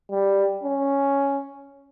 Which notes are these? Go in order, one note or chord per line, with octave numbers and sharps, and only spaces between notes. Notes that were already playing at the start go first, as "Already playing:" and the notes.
G3
C#4